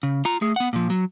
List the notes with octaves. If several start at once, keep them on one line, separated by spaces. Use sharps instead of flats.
C#3
F4 A#5
A3 G#4
B3 F#5
A#2 F3
F#3